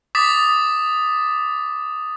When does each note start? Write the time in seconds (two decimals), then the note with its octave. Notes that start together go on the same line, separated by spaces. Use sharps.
0.15 D6 D#6 A6 B6